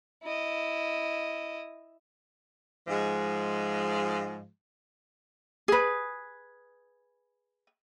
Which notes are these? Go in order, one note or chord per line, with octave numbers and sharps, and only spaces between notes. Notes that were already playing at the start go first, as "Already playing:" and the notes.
E4 D#5
G#2 F3 G#3
G#4 B4